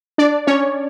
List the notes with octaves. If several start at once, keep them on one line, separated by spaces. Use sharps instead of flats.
D4 D5
C#4 C#5